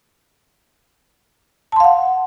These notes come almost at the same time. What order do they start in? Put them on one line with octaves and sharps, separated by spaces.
A5 C6 F5 F#5